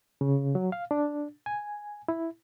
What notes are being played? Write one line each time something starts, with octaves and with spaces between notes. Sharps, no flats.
C#3
F#3
F5
D4
G#5
E4